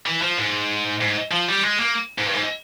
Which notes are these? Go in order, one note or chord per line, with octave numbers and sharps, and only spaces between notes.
E3
F3
G#2
G#2
F3
G3
G#3
A#3
G#2
G2
G#2